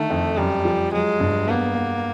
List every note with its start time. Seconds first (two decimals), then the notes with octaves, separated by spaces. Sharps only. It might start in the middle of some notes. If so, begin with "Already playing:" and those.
Already playing: D3 D#3 A3
0.10 F2
0.37 F#2 G3
0.65 F3
0.93 F#3 G#3
1.20 G2
1.48 A#3 B3
1.75 B3